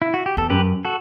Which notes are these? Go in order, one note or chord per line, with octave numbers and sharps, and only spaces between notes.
E4
F#4
G4
E2 A4
F#2 G4 B4
F#4 A4